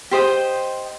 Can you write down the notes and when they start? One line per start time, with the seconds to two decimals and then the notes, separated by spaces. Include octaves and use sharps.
0.11 G4 C5 D#5 G5